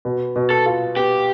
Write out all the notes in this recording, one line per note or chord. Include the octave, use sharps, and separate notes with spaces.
B2
B2
A4
F4
B3 G4